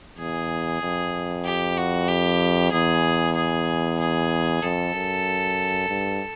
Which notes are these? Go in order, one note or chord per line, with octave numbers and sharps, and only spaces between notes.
E2 G#4
F2
G4
F#4
G4
E2 G#4
G#4
G#4
F2 A4
F#2
G2